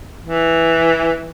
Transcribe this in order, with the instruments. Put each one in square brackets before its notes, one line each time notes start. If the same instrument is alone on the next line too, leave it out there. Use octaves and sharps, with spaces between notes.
[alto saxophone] E3